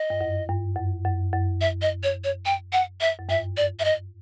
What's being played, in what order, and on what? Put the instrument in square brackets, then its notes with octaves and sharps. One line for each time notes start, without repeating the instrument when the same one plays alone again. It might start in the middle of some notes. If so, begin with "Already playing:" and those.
Already playing: [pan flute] D#5
[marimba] G2
F#2
G2
F#2
F#2
F#2
[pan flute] E5
D#5
C#5
C#5
G5
F#5
E5
[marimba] F#2
[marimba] G2 [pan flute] E5
[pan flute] D5
E5
D#5